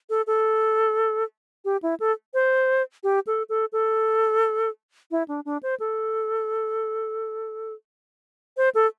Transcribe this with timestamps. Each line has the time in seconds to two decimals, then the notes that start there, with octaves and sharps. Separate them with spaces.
0.10 A4
0.27 A4
1.65 G4
1.82 E4
2.00 A4
2.34 C5
3.03 G4
3.27 A4
3.49 A4
3.72 A4
5.11 E4
5.28 D4
5.45 D4
5.63 C5
5.80 A4
8.57 C5
8.75 A4